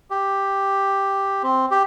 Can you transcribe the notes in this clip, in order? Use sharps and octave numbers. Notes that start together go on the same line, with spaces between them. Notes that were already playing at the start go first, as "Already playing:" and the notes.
G4
C4
G4